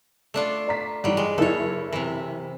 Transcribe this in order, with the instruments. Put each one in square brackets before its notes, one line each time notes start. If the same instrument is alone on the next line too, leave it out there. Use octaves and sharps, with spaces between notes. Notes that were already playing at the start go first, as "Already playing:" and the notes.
[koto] A3 D4 F4
[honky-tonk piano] D5 A#5 B6
[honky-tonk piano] G2 E3 [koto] F#3 G3
[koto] G#3
[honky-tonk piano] F#1 E4 [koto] A4 C#5
[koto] C3 E3